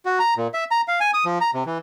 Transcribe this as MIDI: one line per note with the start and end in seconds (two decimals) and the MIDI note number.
0.05 0.19 66
0.19 0.34 82
0.37 0.48 46
0.54 0.64 76
0.71 0.81 82
0.88 1.00 77
1.00 1.11 80
1.14 1.24 87
1.25 1.39 53
1.41 1.51 82
1.54 1.64 48
1.66 1.78 52